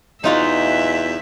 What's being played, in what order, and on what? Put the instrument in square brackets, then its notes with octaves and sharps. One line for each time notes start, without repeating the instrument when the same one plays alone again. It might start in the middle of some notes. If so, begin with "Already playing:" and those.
[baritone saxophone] E2 [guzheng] D#4 F4 F#4 [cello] E5